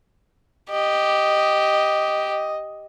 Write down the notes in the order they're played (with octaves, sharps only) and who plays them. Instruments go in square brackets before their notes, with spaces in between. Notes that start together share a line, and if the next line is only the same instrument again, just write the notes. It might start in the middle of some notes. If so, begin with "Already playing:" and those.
[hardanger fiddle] G4 [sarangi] D#5